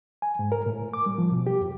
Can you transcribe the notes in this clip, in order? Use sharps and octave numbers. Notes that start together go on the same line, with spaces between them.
G#5
G#2
A#4
A2
D6
G3
F3
B2
G4
F2